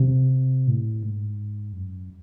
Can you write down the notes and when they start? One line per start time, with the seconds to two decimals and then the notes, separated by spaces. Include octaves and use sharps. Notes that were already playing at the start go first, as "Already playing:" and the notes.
Already playing: C3
0.68 A2
1.03 G#2
1.73 F#2